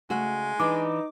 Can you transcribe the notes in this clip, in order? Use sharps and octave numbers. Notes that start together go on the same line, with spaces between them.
C#3 G#3 A3 F#4
E3 D4 D#4 D6